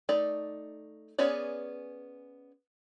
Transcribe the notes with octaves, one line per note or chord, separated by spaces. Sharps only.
A3 D#4 D5
B3 C#4 G#4 C#5 D5